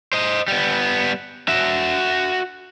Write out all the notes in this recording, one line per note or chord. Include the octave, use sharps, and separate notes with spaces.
C5 D#5
G3 B3
F#4 E5